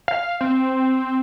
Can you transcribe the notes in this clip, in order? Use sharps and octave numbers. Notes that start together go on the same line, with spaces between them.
F5
C4